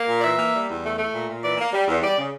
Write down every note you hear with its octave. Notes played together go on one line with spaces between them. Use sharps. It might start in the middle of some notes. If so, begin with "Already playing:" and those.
Already playing: A#3
A#2
D5
E3 E5
A#3
G3
E2
A3
A3
A#2
A#2
E3 D5
A#3
G3
E2
G3 D5
C#3